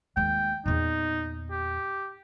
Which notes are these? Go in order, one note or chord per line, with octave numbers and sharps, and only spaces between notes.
D#2 G#3 G5
E2 A#2 D#4
G4